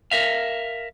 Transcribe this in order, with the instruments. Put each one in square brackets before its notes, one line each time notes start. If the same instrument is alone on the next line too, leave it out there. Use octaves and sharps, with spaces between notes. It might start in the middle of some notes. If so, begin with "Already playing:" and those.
[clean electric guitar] A#4 E5 F5